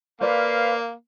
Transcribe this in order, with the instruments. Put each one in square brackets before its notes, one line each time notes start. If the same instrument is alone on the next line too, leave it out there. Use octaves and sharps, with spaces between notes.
[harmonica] A#3 [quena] B4 [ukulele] C5 D5 [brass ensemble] F5